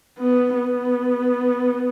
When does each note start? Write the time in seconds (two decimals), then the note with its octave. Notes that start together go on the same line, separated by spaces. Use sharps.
0.19 B3
0.57 B3